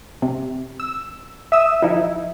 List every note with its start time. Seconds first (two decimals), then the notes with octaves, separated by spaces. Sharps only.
0.22 C3
0.80 E6
1.52 E5 D#6 E6
1.82 F3 D#4 E4